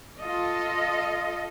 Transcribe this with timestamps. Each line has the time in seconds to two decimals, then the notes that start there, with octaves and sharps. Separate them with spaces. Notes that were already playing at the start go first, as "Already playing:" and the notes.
0.19 F4 A4 D#5